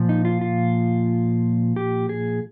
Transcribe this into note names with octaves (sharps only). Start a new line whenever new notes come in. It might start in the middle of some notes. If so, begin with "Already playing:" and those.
Already playing: A#2 F3
D#4
F4
F4
G4
G#4